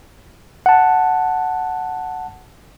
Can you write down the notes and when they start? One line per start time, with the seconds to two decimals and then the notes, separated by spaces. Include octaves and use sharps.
0.66 F#5 A5